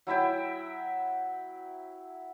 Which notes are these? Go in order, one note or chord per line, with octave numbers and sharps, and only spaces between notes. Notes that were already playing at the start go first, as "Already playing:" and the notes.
F#3 E4 E5 G5